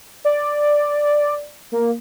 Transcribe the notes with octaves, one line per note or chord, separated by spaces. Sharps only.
D5
A#3